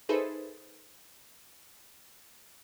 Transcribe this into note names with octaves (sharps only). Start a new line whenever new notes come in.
D#4 G#4 A4 B4 C5 E5